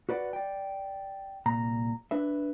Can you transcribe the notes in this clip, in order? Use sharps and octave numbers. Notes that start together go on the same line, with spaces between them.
F#4 B4 D5 F#5
D5 G5
C2 A#2 A#5
D4 B4 E5